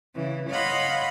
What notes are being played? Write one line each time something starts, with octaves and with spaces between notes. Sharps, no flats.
C#3 E3
C#5 D#5 F5 F#5 B5 C6